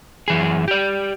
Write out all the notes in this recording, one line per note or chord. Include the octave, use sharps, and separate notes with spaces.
F#2 E3 G#4
G4 D5